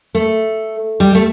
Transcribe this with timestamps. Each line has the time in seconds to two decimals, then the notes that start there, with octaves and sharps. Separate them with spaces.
0.15 A3
1.00 G3
1.15 A3